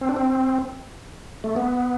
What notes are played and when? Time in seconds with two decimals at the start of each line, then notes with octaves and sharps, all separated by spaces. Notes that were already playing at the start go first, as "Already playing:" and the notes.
0.01 C4
0.09 D4
0.17 C4
1.44 A3
1.56 B3